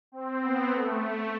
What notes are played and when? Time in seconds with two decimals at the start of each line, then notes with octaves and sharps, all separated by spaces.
0.12 C4
0.41 B3
0.72 A3